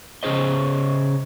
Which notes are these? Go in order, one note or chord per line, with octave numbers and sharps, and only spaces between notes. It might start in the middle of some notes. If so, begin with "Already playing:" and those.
C#3 C#4 G#4 C5 D#5